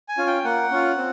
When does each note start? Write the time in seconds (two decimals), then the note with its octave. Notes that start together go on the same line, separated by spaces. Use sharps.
0.09 G#5
0.18 C#4 F4
0.27 G5
0.44 A#3 F#5
0.71 C#4 F4
0.97 C4